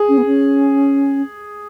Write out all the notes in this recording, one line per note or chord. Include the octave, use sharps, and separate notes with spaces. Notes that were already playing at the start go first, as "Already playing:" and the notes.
Already playing: G#4
C#4
B3
C#4